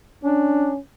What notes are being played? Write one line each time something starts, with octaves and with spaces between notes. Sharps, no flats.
C#4 D4